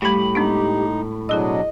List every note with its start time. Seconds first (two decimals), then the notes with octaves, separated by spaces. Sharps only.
0.02 A2 G3 A3 G4 B5
0.35 G#3 B3 D4 D#4
1.29 B2 F#3 D4 E4 G#4 D#5 E6